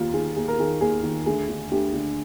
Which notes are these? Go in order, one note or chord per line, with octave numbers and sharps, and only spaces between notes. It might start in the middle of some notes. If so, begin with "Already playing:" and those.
Already playing: D#2 D#3 D#4 F4
D#3 G#4
D#2 G#4
A#4
D#3 G#4
D#2 G#4
D#3
D2 G#4
D3
D2 G4
D3